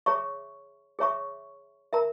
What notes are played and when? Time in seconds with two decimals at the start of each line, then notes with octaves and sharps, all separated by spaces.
0.06 G#4 C#5 E5 A#5 C#6
0.99 G#4 C#5 E5 A#5 C#6
1.93 A#4 E5 A#5